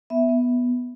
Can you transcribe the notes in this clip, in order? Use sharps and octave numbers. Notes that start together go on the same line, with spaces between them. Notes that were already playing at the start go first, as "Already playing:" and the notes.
B3 E5
B3